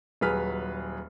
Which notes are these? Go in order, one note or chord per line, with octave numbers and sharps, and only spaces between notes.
D#1 F#3 G#4 B4 F6 B6